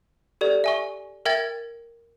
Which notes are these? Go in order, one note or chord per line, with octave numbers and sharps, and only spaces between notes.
G4 A4 D5
E5 G#5 C#6
A#4 E5 G5 G#6 A6